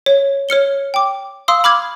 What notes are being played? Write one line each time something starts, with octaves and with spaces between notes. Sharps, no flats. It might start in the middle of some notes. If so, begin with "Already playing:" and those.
C#5
C#5 F6 C#7 G7
G5 D6
F5 C6 D#6 E6
B5 D6 F6 G#6